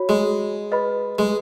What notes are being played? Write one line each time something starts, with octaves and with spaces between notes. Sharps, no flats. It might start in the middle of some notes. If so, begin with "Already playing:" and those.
Already playing: F#4 C#5 B5
G#3
B4 D#5 B5
G#3